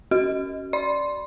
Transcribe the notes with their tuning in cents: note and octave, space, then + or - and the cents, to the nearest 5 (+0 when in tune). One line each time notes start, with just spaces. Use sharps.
C#4 +0 F#4 +30
D5 +0 C6 +0